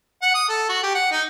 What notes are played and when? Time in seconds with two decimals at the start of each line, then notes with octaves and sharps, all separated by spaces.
0.22 F#5
0.34 D#6
0.49 A4
0.69 F#4
0.83 G4
0.95 F#5
1.12 D#4